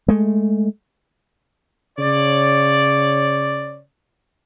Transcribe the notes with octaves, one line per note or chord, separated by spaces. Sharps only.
G#3 A3
C#3 C#5 D5